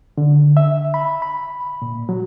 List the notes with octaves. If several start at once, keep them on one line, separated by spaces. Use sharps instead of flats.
D3
E5
B5
B5
A#2
F#3